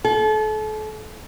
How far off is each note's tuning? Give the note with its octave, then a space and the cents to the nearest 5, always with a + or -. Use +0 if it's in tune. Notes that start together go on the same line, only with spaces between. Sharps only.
A4 -35